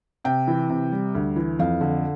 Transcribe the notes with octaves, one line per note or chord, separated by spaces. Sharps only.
C3 G5
E3
C3
G3
D2
E3
F2 F5
D3